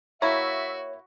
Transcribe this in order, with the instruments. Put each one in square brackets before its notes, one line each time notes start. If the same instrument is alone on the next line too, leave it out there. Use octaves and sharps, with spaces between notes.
[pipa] A#3 E4 [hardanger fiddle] F#4 [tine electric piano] C#5 [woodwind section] E5